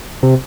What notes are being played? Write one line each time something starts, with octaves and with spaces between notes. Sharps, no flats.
C3